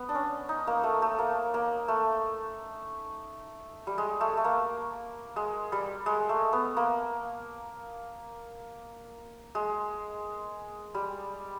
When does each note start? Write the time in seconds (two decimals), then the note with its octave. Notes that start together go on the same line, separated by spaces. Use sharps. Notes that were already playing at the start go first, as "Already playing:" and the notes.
Already playing: B3
0.09 D4
0.15 C#4
0.49 D#4
0.67 A#3
0.83 A3
1.02 A3
1.19 A#3
1.54 A#3
1.88 A3
3.87 G3
3.98 G#3
4.21 A3
4.37 A3
4.44 A#3
5.36 G#3
5.72 G3
6.06 G#3
6.29 A3
6.53 B3
6.77 A#3
9.55 G#3
10.95 G3